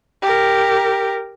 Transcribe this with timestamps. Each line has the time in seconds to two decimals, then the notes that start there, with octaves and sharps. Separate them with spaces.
0.22 G4 A#4